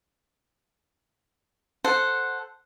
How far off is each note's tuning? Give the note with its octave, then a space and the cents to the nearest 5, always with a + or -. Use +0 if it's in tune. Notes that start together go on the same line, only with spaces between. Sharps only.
A4 +0 C5 +0 F#5 -5